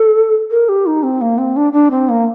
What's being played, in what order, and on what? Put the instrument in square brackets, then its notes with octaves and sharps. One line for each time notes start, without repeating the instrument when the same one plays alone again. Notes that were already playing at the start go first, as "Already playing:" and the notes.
Already playing: [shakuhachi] A4
A#4
G4
D#4
C4
A#3
C4
D4
D4
C4
A#3